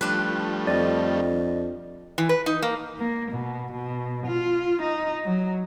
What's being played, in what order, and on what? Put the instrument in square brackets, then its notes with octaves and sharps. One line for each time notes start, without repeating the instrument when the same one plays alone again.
[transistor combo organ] F3 G3 A3 [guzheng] D4 B4
[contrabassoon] F2 [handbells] D5 D#5
[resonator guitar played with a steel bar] E3
B4
D#4
A#3
[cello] A#3
B2
B2
F4
D#4
F#3